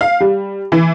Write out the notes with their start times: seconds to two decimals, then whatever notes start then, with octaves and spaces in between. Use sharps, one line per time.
0.01 F5
0.20 G3
0.72 E3